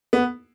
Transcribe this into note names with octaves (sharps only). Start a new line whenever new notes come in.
B3